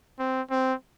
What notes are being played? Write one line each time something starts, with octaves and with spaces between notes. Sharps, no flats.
C4
C4